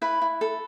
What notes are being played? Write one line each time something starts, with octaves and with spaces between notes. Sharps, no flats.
E4 B4 B5
E4
A4